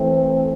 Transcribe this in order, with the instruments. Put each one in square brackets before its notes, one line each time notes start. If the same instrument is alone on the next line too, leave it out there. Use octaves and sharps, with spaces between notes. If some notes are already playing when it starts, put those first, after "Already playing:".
Already playing: [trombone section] E3 A3 C4